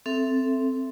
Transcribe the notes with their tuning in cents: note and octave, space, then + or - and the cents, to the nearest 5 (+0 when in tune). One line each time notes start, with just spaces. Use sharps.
C4 +0 A4 +0 E5 +10